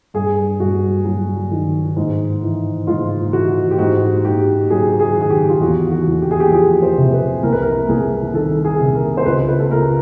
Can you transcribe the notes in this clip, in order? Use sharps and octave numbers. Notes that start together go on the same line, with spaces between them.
G2 G#4
G2 F#4
F#3
D#3
G#2
E3
G#2 F4
E3 F#4
G4
G#2 F#4
G#2 G4
F#3 G#4
G#4
D#3
G#4
G4
F4
E2 F#4
F#4
E2
G4
G#4
G4
F3 G#4
C5
C3
B4
C2 A#4
B4
A#4
C2 G#4
D#3 A4
G#4
C3
A#4
C5
C#2 B4
B4
A4
C#2 A#4